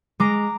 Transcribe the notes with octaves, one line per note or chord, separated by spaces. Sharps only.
G#3 A#5 D6